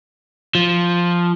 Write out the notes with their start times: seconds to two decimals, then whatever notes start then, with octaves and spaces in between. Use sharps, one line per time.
0.55 F3